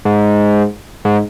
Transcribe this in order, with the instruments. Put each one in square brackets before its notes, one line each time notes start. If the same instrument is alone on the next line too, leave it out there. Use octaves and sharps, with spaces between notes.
[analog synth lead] G#2
G#2